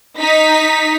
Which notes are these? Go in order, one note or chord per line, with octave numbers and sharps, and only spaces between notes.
D#4 B6